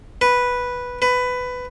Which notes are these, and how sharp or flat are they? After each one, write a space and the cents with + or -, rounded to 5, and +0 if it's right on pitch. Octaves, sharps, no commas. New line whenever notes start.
B4 -5
B4 +15